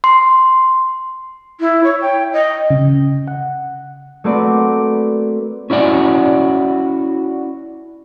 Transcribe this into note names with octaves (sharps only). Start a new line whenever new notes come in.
C6
E4
C#5
G5
D#5
C#3
F#5
A3 A#3 C4 F#4 B4 D5
C#4 E4 F#4 D5 G#5